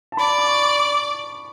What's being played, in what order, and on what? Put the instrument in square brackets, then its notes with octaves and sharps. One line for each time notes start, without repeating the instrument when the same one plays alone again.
[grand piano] A5
[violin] D5 [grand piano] B5
[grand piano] D6
C#6